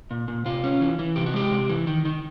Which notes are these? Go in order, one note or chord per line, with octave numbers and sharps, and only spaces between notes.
A#2
A#2
C3 F4
C#4
E3
E3
C3 G4
F#4
G#3 G4
C3
E3
D#3
D#3